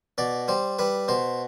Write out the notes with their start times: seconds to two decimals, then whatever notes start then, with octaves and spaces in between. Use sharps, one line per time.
0.18 B2 D5
0.48 G3 C5
0.79 G3 B4
1.08 B2 C5